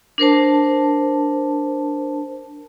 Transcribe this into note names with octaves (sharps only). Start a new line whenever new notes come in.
D4 A#4 C5 A5